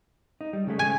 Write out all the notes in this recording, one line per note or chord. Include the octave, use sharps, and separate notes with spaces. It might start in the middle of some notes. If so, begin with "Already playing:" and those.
D#4
G3
C#3 G#3 A3
G#5